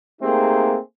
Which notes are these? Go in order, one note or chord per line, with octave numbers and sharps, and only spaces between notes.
A3 A#3 C4 D#4 G4 G#4